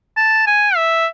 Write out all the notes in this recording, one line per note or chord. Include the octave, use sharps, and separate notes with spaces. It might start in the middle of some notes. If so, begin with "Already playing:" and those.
A5
G#5
E5